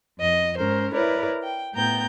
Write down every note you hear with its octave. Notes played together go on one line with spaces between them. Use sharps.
F2 D#5
G#2 C#4 A#4 C5
E4 A#4 B4 C#5 D5
G5
A2 B3 G5 A#5 G6